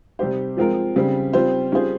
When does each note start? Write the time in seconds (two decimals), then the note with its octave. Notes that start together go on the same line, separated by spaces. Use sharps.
0.19 C3 G3 C4 G4 C5
0.57 F3 G#3 C4 F4 A#4
0.96 C#3 G3 C4
1.33 G3 C4 F4 C5
1.72 G3 C#4 F4 G#4 C5